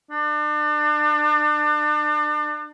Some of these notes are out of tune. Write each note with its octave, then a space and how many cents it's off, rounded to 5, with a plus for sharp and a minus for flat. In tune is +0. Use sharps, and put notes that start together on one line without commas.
D4 +35